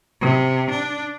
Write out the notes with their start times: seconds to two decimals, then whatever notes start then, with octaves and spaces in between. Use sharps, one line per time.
0.21 C3
0.70 D4